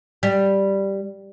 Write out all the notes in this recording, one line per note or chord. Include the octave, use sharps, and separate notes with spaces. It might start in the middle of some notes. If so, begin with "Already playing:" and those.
G3